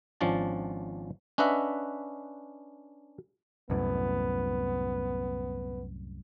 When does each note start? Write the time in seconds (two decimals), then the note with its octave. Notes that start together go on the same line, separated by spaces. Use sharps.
0.21 G#1 F3 C#4 D4 A5
1.38 C#4 D4 B4 D#5 E5 F#5
3.70 C2 F#2 A2 B3